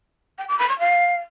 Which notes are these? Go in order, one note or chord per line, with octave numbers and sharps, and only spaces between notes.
G5
D6
B5
C#6
F5